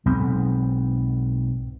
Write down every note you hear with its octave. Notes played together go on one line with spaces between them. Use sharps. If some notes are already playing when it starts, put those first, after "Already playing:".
B1 G#2 B3 C4